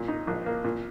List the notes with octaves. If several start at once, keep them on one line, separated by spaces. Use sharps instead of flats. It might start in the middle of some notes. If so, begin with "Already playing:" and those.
Already playing: A#2
D#4
A#1
A#3
A#2